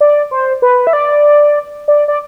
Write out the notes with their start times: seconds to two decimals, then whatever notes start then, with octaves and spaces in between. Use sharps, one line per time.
0.01 D5
0.31 C5
0.62 B4
0.87 E5
0.93 D5
1.88 D5
2.08 D5